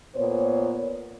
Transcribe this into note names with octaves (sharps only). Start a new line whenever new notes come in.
A#2 B3 C5 C#5